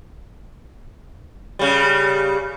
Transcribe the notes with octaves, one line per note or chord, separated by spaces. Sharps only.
C#3 G3